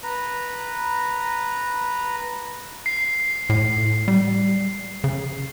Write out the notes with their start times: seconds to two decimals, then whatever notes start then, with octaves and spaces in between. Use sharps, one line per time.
0.03 B4 A#5
2.86 C7
3.50 A2
4.08 G3
5.04 C#3